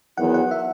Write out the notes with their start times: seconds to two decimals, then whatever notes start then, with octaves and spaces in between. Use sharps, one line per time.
0.17 E2 D#3 F#3 B3 E4 F#5
0.34 F#5
0.51 E5